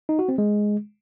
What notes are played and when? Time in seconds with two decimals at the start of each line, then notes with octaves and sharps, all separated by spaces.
0.09 D#4
0.19 F#4
0.29 C4
0.38 G#3